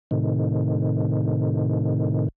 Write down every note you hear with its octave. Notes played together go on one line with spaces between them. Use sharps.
A2 C3 D#3